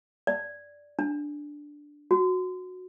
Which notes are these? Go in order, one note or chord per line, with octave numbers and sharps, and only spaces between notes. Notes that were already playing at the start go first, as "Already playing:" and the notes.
D5
D4
F#4